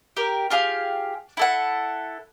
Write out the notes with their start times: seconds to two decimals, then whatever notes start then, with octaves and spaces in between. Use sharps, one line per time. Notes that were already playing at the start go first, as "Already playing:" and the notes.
0.17 G4 A#4
0.50 F4 G4 G#4 F5
1.37 E4 A4 F#5